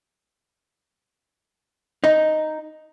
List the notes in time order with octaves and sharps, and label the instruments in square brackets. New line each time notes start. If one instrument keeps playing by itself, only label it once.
[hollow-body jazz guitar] D#4